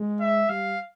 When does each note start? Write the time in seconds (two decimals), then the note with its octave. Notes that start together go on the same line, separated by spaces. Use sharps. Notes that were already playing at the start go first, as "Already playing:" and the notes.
Already playing: G#3
0.20 E5
0.49 G3 F5